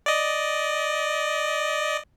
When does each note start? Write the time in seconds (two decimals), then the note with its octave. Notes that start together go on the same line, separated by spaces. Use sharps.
0.06 D5 D#5